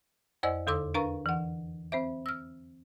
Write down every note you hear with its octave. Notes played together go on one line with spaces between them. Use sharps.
F2 C5 D5 D#5 G#5 E6
E2 D3 A4 C6 D6 E6
D4 A#4 B4 F5 A#5 C#6
E3 F#5
C4 C5 E5
E6 F6